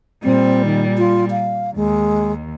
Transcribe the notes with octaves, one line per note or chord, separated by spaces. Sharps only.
A#2 G3 C4
D#3
F4
F5
D#2 G#3